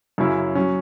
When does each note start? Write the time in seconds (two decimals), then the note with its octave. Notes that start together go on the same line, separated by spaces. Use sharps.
0.18 F#2 C#3 F#3 C#4 E4
0.55 F#3 C#4